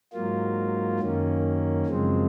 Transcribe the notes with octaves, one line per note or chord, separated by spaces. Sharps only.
G#2 F#3 A#3 F4
F#2 D#3 A#3 C#4
F#2 C#3 F3 G#3 C4